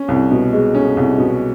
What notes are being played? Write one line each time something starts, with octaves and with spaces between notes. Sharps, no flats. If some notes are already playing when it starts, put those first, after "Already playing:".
Already playing: C#4
C2
B2
G#3
C#4
C2
B2